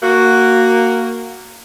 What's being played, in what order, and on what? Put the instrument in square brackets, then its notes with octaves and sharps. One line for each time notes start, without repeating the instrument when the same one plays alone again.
[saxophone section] A#3 F#4